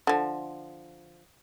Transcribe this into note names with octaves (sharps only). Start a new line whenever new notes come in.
D3 F3